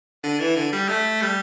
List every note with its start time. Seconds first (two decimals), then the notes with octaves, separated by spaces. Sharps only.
0.24 D3
0.40 E3
0.56 D3
0.73 G3
0.89 A3
1.22 G3